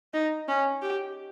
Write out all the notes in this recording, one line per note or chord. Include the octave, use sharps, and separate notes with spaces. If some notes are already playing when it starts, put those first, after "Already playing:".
D#4
C#4
G4